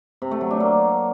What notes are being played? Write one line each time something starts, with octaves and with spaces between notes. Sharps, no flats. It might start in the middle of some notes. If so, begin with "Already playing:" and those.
C3
A3
F#3
D4
A#3